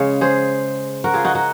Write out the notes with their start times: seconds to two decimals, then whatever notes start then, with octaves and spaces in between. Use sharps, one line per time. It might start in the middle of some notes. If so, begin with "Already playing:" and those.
Already playing: C#3 G#3 C#5 F5
0.21 G#4 C5
1.04 F#4 A#4
1.14 F4 G#4
1.24 D#4 F#4
1.35 D#4 F#4